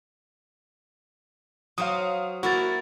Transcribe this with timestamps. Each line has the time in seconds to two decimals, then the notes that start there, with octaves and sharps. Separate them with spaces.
1.78 F#3 C5 F5 D#6
2.43 A#3 E4 F#4 A6